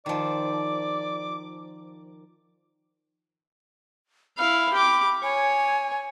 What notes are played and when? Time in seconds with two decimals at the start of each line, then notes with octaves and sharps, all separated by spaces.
0.06 D#3 F3 D5 D6
4.38 E4 F5 B5
4.73 G4 D6
5.23 C#5 G#5